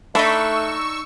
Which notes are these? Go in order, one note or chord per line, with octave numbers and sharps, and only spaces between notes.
A3 D4 D#4 B5 C#6 E6